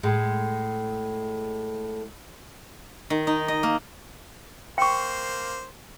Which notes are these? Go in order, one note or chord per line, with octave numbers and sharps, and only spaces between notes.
A2 G#3
D#3
D#4
D#5
A#3
A#3 C5 G5 C#6